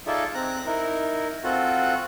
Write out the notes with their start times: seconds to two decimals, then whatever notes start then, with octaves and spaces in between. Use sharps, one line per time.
0.07 D#4 F4 G#4 A4 D5 E5
0.34 C4 A#5 F#6
0.66 D#4 E4 A#4
1.44 C4 F4 F#4 A4 F#5